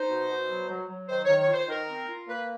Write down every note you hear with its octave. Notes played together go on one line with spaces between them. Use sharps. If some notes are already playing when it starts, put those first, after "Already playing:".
Already playing: D#4 C5
B2
B2
F#3
F#3
F#3
D#3 C5
D#3 C#5
C#5
F4
C5
D#3 A#4
C4
F4
A#3 B4